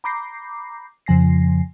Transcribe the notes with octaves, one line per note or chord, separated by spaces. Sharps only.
A#5 B5 D6 G6 A#6 C7
F2 C#3 F3 G#5 A#6 C7